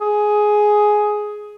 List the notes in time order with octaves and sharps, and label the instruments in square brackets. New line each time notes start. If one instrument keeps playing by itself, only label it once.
[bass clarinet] G#4